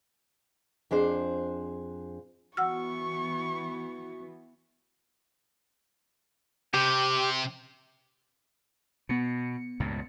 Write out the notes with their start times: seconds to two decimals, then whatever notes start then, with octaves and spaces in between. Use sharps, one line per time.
0.91 F2 D4 G#4 C5
2.57 E3 B3 F#4 F#5 C#6 E6 F6
6.74 C3 G4
9.09 B2 B3 C#7
9.80 C#2 G2 A#2